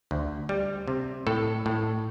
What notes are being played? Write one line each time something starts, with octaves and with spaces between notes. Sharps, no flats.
D2
G3
C3
A2 A4
A2